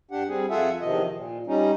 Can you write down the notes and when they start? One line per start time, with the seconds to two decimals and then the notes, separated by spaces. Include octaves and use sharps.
0.11 G2 D4 G4 F#5
0.29 G3 C4 G#4
0.50 F2 F4 G#4 A4 E5 F#5
0.81 E2 C3 D#3 F3 D#5
1.14 A#2
1.47 G3 C#4 D#4